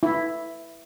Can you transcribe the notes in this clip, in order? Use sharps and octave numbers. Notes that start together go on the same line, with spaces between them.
E4